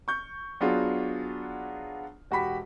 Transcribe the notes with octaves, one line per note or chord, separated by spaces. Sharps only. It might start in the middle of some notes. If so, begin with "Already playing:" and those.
C#6 G6
F#3 B3 D4 F4 F#4 G#4
E1 F#4 G4 B5 B6